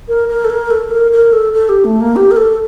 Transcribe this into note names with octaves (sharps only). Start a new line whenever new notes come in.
A#4
A#4
A4
A#4
A4
A#4
A#4
A4
A4
G4
A3
A#3
G4
A#4
A4